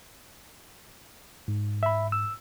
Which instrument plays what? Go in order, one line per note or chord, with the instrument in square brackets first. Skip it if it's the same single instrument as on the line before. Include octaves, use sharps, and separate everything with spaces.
[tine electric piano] G#2
[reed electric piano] E5 B5
E6